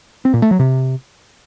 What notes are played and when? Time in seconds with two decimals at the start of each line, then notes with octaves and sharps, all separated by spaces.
0.25 C4
0.34 A#2
0.42 A3
0.51 F#3
0.59 C3